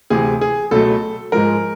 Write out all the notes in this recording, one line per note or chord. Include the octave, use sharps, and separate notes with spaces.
D2 C3 E3 G#4
G#4
C#2 B2 F#3 A3 A4
G#2 F3 G#3 A#4